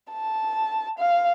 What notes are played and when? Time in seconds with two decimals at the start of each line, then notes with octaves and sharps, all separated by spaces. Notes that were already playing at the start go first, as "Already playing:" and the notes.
0.11 A5
0.99 F5